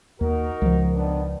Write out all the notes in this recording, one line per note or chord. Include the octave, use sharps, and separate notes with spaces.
D#2 D#4 F#4 A#4
C#2 F3
D#3 B3 D4